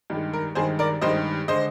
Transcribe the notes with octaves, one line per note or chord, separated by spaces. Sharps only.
G2 D#3 G#3
A#4
G2 D#3 G#3 G#4 C5
A#4 D5
G2 D#3 G#3 C5 D#5
D3 G#3 C5 D#5